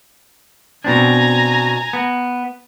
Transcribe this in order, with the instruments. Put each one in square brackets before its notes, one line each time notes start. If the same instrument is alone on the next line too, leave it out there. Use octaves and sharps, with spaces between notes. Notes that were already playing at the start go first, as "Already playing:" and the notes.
[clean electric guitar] B2 C4 D4 [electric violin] G#5 A#5
[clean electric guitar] B3